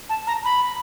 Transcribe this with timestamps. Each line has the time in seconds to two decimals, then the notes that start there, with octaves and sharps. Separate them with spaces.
0.09 A5
0.27 A#5
0.45 B5